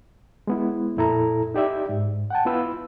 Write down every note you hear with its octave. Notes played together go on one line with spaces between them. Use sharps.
G#3 B3 E4
F2 A#2 E4 A4 A#5
D#4 G4 D5 E5
G#2
F#5 G5 A5
B3 E4 F4 B4 E6